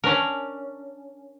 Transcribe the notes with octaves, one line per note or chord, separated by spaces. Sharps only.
C#4 D4 A#4